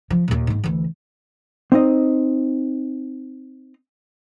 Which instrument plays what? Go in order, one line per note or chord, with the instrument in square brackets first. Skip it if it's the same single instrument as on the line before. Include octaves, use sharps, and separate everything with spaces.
[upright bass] F3
D#2 A#2
G#2 A#3
D2 E3
[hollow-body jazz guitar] C4 D#4 D#5